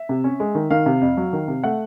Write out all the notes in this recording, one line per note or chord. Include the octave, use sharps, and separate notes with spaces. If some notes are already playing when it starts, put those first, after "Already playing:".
Already playing: E5
C3
C#4
G#3
D#3
D#3 F5
C3
F2
F#3
D#3
C3
A3 F#5